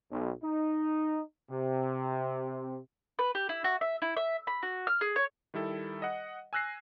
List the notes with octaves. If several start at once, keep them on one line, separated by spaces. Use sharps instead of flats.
B1
D#4
C3
B4
G4
E4
F#4
E5
E4
E5
B5
F#4
F6
G#4
C#5
D#3 G3 E4 A4
D#5 F#5
G#5 E6 F#6 A#6 C7